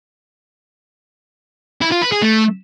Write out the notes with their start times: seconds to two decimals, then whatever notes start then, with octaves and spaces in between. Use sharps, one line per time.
1.81 E4
1.92 F4
2.02 B4
2.12 G#4
2.22 A3